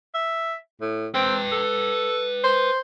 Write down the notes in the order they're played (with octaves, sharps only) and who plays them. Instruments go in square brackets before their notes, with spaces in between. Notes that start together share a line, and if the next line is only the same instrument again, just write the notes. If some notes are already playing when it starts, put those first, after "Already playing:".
[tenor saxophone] E5
A2
[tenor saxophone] C4 [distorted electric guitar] B4 G5
[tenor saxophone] A4
C5